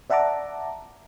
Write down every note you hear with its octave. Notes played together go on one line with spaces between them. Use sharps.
D5 E5 F#5 A5 A#5 D6